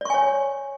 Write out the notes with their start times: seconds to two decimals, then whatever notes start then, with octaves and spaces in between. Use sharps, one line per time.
0.01 D5
0.05 C#6
0.10 G#5
0.14 C#5